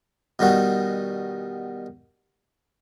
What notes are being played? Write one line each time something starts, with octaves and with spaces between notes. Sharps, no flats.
B2 D#3 G3 F#4